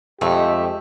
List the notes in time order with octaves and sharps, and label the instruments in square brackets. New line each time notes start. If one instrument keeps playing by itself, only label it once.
[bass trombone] F2 [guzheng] G#3 [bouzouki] A3 [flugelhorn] G4